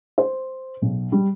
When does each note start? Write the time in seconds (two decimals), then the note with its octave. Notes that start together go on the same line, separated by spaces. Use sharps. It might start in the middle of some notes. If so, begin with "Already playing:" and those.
0.18 C5
0.82 B1
1.12 G3